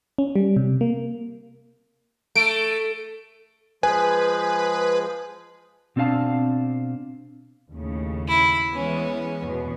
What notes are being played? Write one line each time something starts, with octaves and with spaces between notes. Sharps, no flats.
C#4
G3
C3
A#3
A3 D7
F3 G#3 G#4 B4 G#5
B2 C4 D4 F#4 F5 A5
D#2 A2 C#3
E4
E3 G#3 B3 C#4
E2 B2